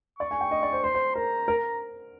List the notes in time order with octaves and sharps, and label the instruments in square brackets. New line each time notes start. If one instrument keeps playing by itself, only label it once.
[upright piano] D5 [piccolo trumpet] C#6
[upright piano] G#5
G5
D#5
D5
C5
[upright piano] C5 [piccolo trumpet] C6
[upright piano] C5
[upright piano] A#4 [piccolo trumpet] A#5
[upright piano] A#4